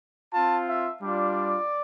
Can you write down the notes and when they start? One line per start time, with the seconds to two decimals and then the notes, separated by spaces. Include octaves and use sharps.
0.33 C4 F4 A5
0.68 E5
1.03 G3 D4 F4 D5